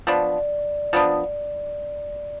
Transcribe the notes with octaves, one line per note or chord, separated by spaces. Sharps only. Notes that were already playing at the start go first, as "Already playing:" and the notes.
F3 B3 D4 D5
F3 B3 D4